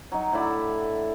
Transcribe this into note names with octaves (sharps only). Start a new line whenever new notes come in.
F#3 D#4
A2 D3 E4 D5